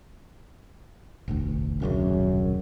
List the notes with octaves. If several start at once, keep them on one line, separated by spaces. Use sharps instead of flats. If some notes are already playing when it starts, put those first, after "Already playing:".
E1 A1 D2
D#1 B1 F#2 C#3